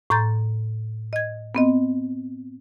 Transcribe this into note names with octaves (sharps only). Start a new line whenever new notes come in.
A2 A#5 C6 G6 A6
D#5 G#6
B3 C4 D#5